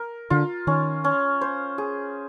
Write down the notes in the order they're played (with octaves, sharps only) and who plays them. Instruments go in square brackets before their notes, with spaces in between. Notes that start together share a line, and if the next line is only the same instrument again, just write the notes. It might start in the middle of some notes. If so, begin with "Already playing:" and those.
Already playing: [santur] A#4
[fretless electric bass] D3 [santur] F4
[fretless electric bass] D#3 [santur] C#4
[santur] C#4
C5
G#4